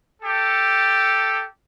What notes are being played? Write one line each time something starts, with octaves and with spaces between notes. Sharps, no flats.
G4 A4